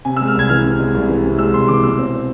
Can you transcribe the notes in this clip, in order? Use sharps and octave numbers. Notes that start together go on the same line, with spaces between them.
C3 G#5
G#3 E6
F6
C2 G#6
E3 F6
C3
G#3
C2
E3
C3
G#3 E6
C2 C6
E3 D6
B2 E6
C4